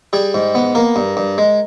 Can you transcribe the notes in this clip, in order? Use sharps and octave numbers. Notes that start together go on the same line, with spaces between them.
G3 G#4
G#2
B3
A#3 A#4
G2
G2
G#3